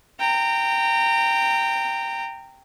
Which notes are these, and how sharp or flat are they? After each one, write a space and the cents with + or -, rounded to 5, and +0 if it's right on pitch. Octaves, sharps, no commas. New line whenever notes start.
G5 +0 A#5 -25